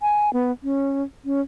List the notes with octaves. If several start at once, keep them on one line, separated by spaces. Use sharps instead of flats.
G#5
B3
C#4
C#4